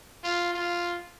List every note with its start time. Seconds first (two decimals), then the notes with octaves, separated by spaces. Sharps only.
0.23 F4
0.54 F4